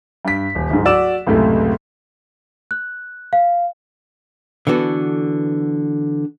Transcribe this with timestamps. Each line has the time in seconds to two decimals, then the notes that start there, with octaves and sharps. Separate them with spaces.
0.25 G2 B6
0.55 D#1
0.70 D1 G#2
0.85 F#4 D5 E6 E7
1.27 C#2 F#2 A2 C3 A3
2.71 F#6
3.33 F5
4.67 D3 E3 B3 F#4 A4